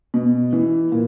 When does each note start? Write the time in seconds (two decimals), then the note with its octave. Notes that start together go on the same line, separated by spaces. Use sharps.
0.14 B2
0.53 E3
0.92 A#2